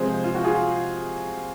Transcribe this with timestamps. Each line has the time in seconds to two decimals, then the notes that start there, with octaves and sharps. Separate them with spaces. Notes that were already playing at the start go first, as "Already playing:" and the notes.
Already playing: C3 F3 G#3 G#4 C5
0.24 F4
0.35 F#4
0.45 F4 G#4